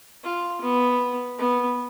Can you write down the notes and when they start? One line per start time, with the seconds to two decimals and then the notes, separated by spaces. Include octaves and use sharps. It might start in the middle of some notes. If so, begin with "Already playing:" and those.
0.24 F4
0.62 B3
1.39 B3